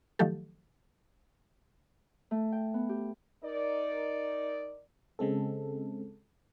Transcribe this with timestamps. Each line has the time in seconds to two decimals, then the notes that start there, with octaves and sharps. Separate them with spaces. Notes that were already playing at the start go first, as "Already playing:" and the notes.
0.19 D#3 F3 F#3 A3 G4 A4
2.31 A3
2.52 G5
2.74 B3
2.89 G4
3.44 D#4 A#4 D5
5.19 C#3 G#3 C4 A4